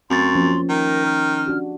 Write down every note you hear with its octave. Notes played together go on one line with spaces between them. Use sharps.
F#2 A3 C4 C6 C#6 A6
F3 A#3 C#4
D#3 A#4
F6
D4 F#4 G4